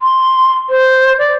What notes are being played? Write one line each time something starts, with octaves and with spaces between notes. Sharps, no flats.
C6
C5
D5